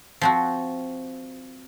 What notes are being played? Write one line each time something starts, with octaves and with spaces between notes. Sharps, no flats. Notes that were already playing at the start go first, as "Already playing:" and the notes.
F3 C4 F#4